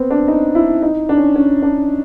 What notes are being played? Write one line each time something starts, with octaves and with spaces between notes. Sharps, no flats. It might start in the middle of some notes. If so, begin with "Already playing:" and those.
Already playing: B3 C4
D4
D#4
E4
D#4
D4
C#4
C#4
D4